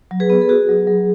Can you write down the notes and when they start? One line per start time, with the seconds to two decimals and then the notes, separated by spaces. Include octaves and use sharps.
0.11 F#3
0.20 G#4 B4
0.30 B3
0.42 A4
0.49 F#4 G#4
0.69 F#3
0.87 F#3